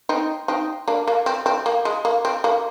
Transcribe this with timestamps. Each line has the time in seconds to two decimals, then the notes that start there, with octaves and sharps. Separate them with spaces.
0.09 C4 D#4
0.48 C4 D#4
0.88 A#3 D4
1.08 A#3
1.26 C4
1.46 C4
1.66 A#3
1.85 G#3
2.05 A#3
2.25 C4
2.44 A#3